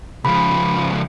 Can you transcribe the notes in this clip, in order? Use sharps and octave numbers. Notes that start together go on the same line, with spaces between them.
C#2 F3 B5